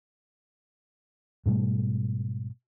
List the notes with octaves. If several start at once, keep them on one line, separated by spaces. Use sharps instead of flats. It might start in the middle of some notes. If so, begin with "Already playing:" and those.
G#2 B2 G3 A3